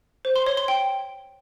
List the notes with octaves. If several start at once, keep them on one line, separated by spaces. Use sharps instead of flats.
C5
C6
C#5
C6
G5